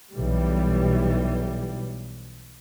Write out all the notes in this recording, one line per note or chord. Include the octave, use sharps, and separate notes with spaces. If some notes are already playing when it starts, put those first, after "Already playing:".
B1 E3 G3